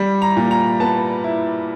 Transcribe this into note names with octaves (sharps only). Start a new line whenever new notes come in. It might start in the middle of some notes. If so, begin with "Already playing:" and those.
Already playing: G3
A#5
A#2
A#5
B3 A5
E4